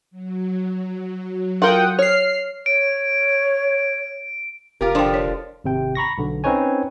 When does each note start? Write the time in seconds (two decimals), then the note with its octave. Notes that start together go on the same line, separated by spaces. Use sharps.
0.11 F#3
1.62 F4 A#4 F#5 G5 D#6
1.99 C#5 F6 C7
2.66 C#5 D7
4.81 F1 F4 G4 A#4
4.95 D3 F3 D4 G5
5.14 C#5
5.64 G#1 C3 G5
5.95 A#5 B5 C#6 A#6
6.18 B1 D3
6.44 C4 C#4 D#4 B4 C#5 G#5